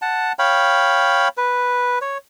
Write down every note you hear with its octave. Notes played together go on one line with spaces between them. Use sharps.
F#5 A5
C#5 F5 G5 B5
B4
C#5